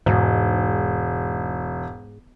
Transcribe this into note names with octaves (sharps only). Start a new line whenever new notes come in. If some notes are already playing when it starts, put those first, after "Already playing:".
E1 G#2